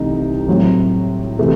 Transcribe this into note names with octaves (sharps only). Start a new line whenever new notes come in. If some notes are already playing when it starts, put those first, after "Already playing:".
Already playing: C2 C3 E3 A3 D#4
A2 F#3 C4
C3 E3 A3